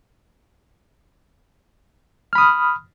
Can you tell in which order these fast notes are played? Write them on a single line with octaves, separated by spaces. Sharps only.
F6 B5 D#6